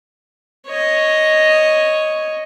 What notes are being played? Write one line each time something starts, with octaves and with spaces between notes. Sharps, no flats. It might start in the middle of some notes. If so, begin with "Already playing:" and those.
C#5 D#5